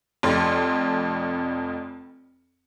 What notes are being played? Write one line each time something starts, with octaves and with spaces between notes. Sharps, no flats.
F1 F2 C6